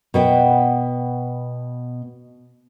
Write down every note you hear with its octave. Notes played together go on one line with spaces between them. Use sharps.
B2 B3 G5